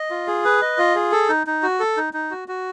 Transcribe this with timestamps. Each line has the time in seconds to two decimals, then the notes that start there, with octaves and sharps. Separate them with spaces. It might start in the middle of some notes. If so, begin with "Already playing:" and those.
Already playing: D#5
0.10 F4
0.27 G#4
0.45 B4
0.62 D#5
0.78 F4
0.95 G#4
1.12 A4
1.29 D#4
1.47 D#4
1.63 F#4
1.80 A4
1.97 D#4
2.13 D#4
2.31 F#4
2.48 F#4